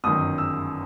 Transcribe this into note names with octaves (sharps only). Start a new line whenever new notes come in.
G1 F#2 D#3 D#6
E6